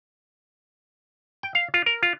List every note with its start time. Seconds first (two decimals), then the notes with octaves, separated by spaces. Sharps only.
1.43 G5
1.55 F5
1.74 F4
1.86 A#4
2.03 F4